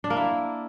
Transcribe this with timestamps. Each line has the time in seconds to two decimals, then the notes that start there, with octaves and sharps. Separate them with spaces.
0.04 D4
0.10 A#3
0.17 E4